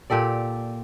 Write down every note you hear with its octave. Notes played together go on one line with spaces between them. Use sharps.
A#2 G4 A4 D5